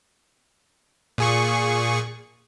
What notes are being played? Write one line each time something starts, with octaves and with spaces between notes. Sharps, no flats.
A#2 G#4 C#6